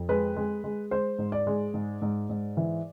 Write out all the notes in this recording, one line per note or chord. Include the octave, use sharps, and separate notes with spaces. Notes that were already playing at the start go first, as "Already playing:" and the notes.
Already playing: F2
G#3 B4
G#3
G#3
G#3 C5
G#2
D5
G#3
G#2
G#2
G#2
E3